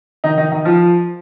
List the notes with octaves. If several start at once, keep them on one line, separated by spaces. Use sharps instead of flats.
D#3 D#4
D#3 D#4
D#3 D#4
F3 F4